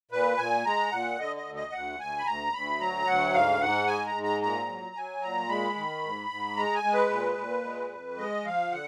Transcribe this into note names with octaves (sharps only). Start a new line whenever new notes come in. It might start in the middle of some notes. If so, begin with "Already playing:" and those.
A#2 B4
A#2 G#5
G#3 A#5
A#2 F#5
D3 D#5
D#5
D2
D#5
D2 F#5
D2 G#5
B5
D2 A#5
D2 B5
F#3 A#5
D2 F#5
G#2 F5
G#2 F#5
G#3 G#5
A#5
G#2
A#5
A#2 A#5
F#3
F#3 G#5
A#2 A#5
G#3 B5
D#3
G#2
G#2
G#3 A#5
G#5
G#3
B4
A#2
A#2
G#3
F2
G#3 D#5
F3 F5
D3 F#5